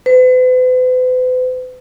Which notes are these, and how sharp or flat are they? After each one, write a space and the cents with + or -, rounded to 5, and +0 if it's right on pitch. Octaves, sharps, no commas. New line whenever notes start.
B4 +45